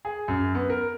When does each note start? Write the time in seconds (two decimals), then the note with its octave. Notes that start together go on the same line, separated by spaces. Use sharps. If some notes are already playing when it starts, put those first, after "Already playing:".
0.05 G#4
0.28 F#2
0.55 B3
0.70 A#4